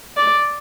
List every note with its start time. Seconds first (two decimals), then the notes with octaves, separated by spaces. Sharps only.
0.17 D5